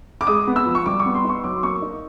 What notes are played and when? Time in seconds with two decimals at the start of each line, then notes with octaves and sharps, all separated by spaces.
0.21 D6
0.27 G#3 D#6
0.47 B3
0.56 E6
0.66 F3
0.75 C#6
0.86 G3 D6
1.00 C#6
1.06 B3
1.14 C6
1.24 D#4 C#6
1.44 F#3 D6
1.56 C6
1.63 A#3 C#6
1.82 D#4